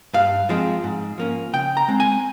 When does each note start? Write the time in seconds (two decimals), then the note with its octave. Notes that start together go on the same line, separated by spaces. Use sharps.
0.14 G2 F5
0.49 F3 G#3 C4
0.84 G#2
1.18 F3 A#3 C#4
1.53 C#3 G5
1.77 A#5
1.88 G#3 C4
2.00 G#5